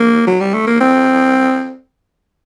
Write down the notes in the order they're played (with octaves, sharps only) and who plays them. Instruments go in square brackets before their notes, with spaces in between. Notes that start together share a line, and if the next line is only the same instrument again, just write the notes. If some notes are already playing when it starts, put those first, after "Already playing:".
Already playing: [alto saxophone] A#3
F#3
G3
A3
A#3
C4